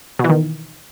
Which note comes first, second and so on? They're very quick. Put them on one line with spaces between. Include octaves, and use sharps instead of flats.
B2 E3 D#3